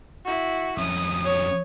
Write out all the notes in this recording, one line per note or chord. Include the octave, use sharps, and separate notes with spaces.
E4 F#4
F2 C#4 D#6
C#5